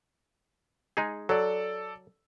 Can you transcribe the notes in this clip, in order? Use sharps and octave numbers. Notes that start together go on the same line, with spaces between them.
G#3 D#4 G#4
F#3 A4 D5